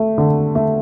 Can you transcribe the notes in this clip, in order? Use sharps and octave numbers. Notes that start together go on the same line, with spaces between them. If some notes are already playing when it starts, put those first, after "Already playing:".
Already playing: A3
D3
A3